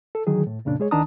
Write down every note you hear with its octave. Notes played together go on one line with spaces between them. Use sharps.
A4
D3 D#3 F#3 G#4
A2
F2 A#2 C#3 D4
G#3 G#4 C#5
C#2 D#3 D4 A5 A#5 D#6